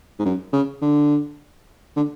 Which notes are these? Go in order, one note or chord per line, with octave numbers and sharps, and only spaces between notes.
G#2
F#2
C#3
D3
D3